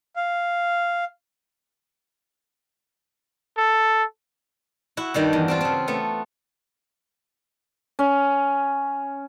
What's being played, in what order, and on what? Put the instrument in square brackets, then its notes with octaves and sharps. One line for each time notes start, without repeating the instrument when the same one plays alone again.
[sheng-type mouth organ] F5
[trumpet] A4
[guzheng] E4 F#4
G2 D#3 G3 F#4
E2
C4 D4 F4
C#3 C4
A3 B3
[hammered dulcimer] C#4